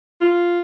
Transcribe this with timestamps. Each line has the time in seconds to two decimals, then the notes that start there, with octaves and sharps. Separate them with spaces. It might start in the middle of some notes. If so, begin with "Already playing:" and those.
0.21 F4